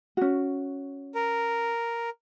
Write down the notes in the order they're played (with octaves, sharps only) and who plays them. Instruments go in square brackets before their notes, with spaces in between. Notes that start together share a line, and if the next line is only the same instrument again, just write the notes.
[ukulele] C#4 F#4
[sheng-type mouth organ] A#4